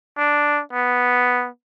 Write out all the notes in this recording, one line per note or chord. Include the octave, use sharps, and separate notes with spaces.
D4
B3